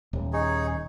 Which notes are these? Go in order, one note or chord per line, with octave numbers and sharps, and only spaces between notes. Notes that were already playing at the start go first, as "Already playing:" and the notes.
D#1
D#4 G#4 C#5